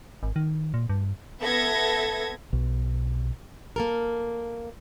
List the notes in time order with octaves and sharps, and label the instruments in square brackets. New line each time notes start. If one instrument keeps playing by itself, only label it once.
[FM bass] G#1
D#3
A#2
G2
[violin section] B3 A4 E5 G#6 A#6
[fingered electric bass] B1
[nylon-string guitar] A#3 A4 A#4